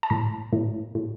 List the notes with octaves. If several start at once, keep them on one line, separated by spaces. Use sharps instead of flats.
A5
A2 A#5
A2
A2